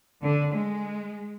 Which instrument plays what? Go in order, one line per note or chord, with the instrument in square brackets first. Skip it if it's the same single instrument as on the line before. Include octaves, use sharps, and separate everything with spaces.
[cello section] D3
G#3